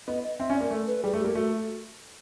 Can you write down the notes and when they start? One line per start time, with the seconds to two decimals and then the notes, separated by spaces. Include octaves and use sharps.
0.08 B3 D#5
0.23 D#5
0.39 C4 E5
0.50 C#4
0.55 D5
0.60 A#3
0.71 A3
0.87 B4
1.03 G3 G#4
1.13 A3
1.19 G4
1.24 A#3
1.35 A3 F#4